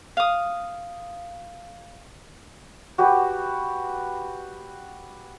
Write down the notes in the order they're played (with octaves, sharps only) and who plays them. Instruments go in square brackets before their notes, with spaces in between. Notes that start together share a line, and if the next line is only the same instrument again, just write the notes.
[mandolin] F5 D#6
[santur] F#4 G4 B4 D5